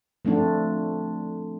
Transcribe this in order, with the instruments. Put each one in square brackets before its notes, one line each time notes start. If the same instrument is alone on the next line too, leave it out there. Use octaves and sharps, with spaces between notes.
[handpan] F3 A3 C4 D4